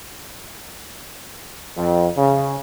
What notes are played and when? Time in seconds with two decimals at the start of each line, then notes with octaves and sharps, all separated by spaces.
1.76 F2
2.16 C#3